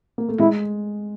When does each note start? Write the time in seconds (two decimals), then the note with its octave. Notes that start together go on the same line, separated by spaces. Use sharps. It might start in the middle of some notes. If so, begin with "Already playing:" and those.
0.18 A#3
0.29 A3
0.39 G#3 E4